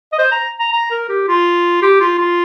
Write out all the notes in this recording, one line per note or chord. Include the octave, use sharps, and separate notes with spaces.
D#5
C5
A#5
A#5
A#5
A#4
G4
F4
G4
F4
F4